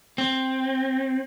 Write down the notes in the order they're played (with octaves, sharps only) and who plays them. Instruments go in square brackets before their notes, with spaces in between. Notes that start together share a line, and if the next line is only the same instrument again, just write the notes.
[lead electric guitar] C4